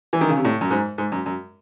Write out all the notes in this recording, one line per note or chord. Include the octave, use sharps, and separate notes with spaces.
E3
D#3
C#3
C3
A2
F#2
G#2
G#2
F#2
F#2